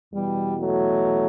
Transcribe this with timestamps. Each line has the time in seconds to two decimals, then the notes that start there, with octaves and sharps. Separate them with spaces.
0.13 E2 B2 G3
0.60 F#3 A3